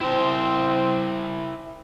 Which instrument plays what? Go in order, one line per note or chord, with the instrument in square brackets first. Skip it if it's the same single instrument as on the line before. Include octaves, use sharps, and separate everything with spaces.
[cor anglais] C4 [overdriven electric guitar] E4 C5